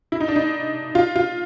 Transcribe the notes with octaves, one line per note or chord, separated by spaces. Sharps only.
E4
D#4
D4
D#4
F4
F4